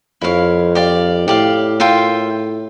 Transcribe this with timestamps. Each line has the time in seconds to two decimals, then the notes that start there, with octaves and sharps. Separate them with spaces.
0.21 F2 E4 A#4 C#5 F5
0.75 G4 D5 F5
1.27 A2 G4 D5 F5
1.80 F4 A#4 E5 G5